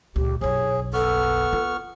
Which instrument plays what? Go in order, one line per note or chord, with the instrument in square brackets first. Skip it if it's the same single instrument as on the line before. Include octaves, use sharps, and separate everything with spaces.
[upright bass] C#2 A#2 [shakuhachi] G4
[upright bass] F#1 B1 [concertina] G#4 [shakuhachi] C#5
[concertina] B3 C#6 F6 [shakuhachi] A4
[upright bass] F4